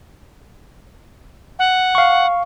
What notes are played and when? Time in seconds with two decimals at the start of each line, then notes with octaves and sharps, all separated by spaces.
1.59 F#5
1.95 F5 C#6